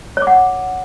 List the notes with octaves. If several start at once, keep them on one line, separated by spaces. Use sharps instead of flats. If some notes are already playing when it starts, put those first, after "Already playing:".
C#5
D6
F#5